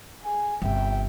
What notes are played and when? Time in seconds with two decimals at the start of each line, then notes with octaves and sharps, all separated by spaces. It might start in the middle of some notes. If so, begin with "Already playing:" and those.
0.22 G#4 G#5
0.62 G1 C3 E5 G5